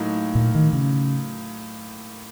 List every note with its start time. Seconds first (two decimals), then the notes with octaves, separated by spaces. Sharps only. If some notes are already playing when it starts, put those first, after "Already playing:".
Already playing: A2 F#3 A#3 D#4 A#4
0.35 A#2
0.55 D#3
0.73 C#3